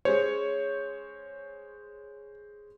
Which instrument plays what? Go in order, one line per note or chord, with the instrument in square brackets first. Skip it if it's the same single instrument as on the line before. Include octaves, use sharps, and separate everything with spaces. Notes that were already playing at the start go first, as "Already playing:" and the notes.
[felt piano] G#3 C#4 C5 [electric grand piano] C#5